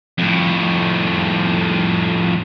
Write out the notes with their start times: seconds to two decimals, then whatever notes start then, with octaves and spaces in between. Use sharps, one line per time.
0.18 F2 A2